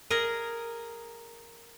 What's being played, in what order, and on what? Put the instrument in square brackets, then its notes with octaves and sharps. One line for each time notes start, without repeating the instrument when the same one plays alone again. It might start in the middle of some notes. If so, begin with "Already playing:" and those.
[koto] G#4 A#4 D#5